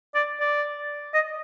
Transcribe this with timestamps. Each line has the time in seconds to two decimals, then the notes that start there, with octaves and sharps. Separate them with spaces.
0.15 D5
0.40 D5
1.14 D#5